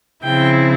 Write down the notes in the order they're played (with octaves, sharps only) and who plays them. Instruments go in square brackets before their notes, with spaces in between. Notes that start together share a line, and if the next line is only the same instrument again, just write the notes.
[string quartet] C#3 F3 C4 E4 G5